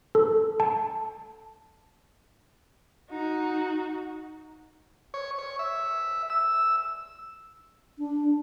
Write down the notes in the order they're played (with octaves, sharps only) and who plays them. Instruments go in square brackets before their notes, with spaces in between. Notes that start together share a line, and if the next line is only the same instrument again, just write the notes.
[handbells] A4
A5
[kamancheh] D#4 F#4
[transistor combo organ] C#5
C#5
E5
E6
[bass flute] D4